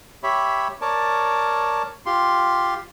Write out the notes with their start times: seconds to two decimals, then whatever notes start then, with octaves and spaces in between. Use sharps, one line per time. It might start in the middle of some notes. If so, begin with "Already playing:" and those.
0.23 G4 C#5 E5 B5
0.81 A#4 C#5 D5 A5
2.06 F4 G4 C6